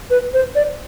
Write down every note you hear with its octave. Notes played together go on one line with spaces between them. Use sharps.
B4
C5
D5